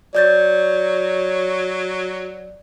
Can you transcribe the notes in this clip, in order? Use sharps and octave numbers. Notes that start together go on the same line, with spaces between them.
F#3 C#5 D5 G6 A6